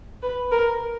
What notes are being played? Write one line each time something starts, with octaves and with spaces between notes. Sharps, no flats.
B4
A#4